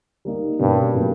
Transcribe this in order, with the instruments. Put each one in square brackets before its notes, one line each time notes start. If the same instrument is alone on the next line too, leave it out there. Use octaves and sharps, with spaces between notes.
[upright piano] G3 A#3 D#4
[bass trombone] G2 [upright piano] B2 G3 A#3 C#4
[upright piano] A2 F#3 A#3 C#4